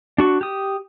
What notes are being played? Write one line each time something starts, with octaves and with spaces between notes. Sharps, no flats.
D4 F#4 C#6
G4 D#6